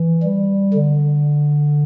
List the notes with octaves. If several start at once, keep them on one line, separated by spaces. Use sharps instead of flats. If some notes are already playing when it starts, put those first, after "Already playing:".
Already playing: E3
G3
D3